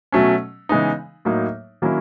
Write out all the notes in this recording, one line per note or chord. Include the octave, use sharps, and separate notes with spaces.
B2 F#3 A3 C#4
C#3 E3 G#3 B3 D#4
A2 F#3 A#3 D#4
D#3 F#3 A#3 C#4 E4